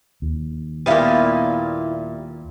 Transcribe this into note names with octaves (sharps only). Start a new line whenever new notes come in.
D#2
A#2 G3 B3 E4 F5